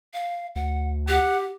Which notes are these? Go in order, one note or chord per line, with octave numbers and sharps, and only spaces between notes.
F5
D2 F#5
G4 F#5